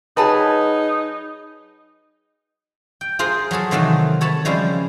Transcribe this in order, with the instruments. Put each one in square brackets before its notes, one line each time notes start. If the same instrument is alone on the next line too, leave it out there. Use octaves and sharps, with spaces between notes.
[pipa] F#3 A5 [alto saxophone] D#4 [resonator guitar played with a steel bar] G#4 B4
[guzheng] G5
F4 G#4 A#4 C5
F#3 F#4 G#4 A4
C3 D#3 E3 F#3 A3 F4
A4 C#5 A5 B5
C#3 F3 G3 G#3 E4